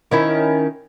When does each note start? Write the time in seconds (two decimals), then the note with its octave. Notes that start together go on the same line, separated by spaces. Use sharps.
0.11 D#3 C#4 E4